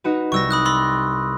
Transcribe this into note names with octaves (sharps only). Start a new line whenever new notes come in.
D#4 F#4 B4
C2 G3 C#6 E6 A#6
B5 D#6 F#6
B5 C6 E6 A6 A#6